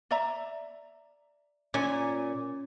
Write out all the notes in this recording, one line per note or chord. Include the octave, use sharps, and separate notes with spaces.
D5 E5 A#5
A#2 C#4 G#5